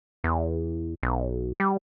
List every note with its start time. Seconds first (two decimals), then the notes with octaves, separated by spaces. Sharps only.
0.24 E2
1.03 B1
1.60 G3